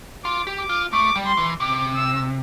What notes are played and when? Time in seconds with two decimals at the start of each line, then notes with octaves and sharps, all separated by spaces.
0.25 F4 D6
0.47 G4
0.59 D6
0.69 F4
0.92 A3 D6
1.16 G3
1.26 C6
1.37 E3
1.60 C3 D6
1.95 E6